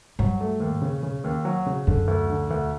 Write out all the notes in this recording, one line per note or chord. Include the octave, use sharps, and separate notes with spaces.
G2 F#3
A3
D#2
C#3
C#3
D#2
F#3
C#3
F#2 D3
D2
D3
D2